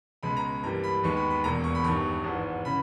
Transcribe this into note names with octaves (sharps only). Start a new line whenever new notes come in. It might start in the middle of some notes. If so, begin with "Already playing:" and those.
C#2 B2 G#3 B5
A#5
G2 E3 G3 A#3 A#5
B5
D#2 D#3 G#3 B3 C#6
B5
B5
E1 E2 B2 A#3 A#5
C#6
B5
G1 G2 D#3 C#6
G#1 G#2 E3
C#3 E3 B5